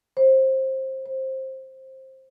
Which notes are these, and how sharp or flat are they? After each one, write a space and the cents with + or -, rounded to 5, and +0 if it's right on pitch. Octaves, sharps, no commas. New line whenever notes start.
C5 +20
C5 +15